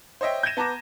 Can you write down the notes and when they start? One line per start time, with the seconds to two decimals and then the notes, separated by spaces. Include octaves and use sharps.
0.21 C5 C#5 D#5 E5 G5
0.43 G6 G#6 A#6 D#7 E7
0.57 B3 A5 A#5 D6 A#6